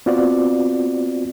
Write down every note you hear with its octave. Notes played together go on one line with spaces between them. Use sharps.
B3 C4 F4 F#4 C5 D5